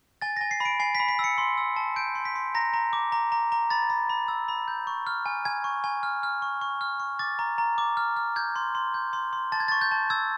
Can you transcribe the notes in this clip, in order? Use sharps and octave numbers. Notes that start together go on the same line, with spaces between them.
G#5 A6
G#5 A#6
C7
B5 D7
G#5 C7
B6
B5
B6
E6
C#7
C6
E6
A5
G6 D7
C6
B6
C6
A#5 A#6
A#5
D6
A#5
A#5
A#5
B5 A6
B5
B5
E6
B5
G6
C#6
F6
G#5
G#5 G#6
C#6
G#5
F6
F6
C#6
C#6
F6
C#6
D6 A6
A#5
A#5
D6
F6
F6
G6 G#6
C6
C6
G6
C6
C6
A5 A6
G#6
C#6 A6
G6
A5
E6 G#6